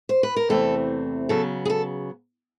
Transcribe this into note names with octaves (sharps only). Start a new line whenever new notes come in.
C5
B4
A#4
E2 C3 E3 A3 C4 A4
C#3 F#3 B3 A4
G#4
A4